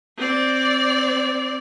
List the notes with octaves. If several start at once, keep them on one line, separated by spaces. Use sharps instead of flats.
C4 D5